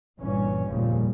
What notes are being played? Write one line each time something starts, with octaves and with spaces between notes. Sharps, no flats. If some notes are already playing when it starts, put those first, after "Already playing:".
G1 G2 A#2 E3 C#4
F1 D#2 A#2 C#3 F3 G3